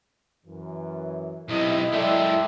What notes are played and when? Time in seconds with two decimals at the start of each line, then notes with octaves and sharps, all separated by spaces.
0.46 F#2 E3
1.49 B1 C3 E4 D#5
1.93 F#2 G#3 A4 D5 E5 G5